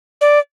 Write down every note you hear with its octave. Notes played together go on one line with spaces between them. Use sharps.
D5